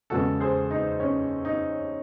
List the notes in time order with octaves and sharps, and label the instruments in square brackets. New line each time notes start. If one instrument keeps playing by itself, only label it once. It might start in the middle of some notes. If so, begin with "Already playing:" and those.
[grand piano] E2 C#3 G#3 F#4 A4
G#4 C5
D#4
C#4
D#4